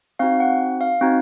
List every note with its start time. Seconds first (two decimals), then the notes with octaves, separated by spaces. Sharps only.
0.19 C4 D#4 F#4 F5
0.40 F#5
0.81 F5
1.01 C4 D#4 F#4